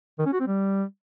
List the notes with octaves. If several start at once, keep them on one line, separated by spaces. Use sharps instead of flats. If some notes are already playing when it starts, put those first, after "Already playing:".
D#3
C#4
F#4
C4
G3